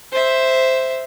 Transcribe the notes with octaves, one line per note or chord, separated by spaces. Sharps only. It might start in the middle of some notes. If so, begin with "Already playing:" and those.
C5 E5